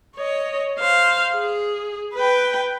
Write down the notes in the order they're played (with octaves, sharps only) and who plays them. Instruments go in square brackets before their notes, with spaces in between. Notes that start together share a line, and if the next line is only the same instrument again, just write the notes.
[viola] C#5 D#5
C5 F5
G#4
B4 G5